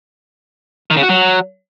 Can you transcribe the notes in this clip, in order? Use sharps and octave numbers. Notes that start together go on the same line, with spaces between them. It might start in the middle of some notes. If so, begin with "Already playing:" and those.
D#3
C#3
F#4
F#3